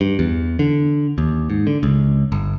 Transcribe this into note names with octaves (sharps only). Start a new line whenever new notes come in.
G2
E2
D3
D#2
G#2
D3
C#2
G1